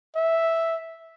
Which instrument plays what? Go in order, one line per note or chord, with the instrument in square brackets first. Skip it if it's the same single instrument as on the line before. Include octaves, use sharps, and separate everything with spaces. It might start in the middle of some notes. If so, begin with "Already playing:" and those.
[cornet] E5